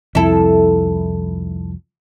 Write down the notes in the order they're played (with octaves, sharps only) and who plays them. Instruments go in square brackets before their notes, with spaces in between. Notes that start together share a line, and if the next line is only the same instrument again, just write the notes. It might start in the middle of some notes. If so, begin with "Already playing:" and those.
[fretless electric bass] C2 F2 [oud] E4 A4